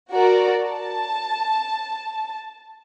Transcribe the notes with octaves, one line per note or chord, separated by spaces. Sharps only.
F#4 A#4 D5
A5